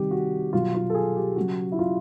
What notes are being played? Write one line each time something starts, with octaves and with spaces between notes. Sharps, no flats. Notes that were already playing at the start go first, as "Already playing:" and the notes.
Already playing: C3 D#3 G3 G4
F#4
B2 F#3 F4
F4
A4
G#4
G4
C#3 F#3 F#4
E4
F4